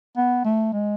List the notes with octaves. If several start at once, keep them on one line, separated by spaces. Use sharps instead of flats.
B3
A3
G#3